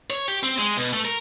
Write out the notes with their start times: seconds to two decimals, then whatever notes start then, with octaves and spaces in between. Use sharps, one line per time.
0.10 C#5
0.28 G4
0.43 C4
0.58 G#3
0.77 B2
0.93 A3
1.05 A#4